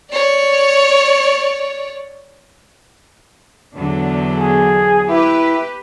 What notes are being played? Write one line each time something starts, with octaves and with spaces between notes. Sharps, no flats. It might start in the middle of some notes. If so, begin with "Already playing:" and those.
C#5 D5
E2 D3 F#3
G#4
E4 G4 B4